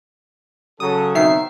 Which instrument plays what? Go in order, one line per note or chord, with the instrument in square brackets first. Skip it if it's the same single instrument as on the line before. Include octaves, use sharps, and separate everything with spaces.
[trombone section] C#3 F#3 [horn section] A4 [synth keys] D#6
[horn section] B2 C4 D#4 [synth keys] D#3 C7 [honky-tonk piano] E5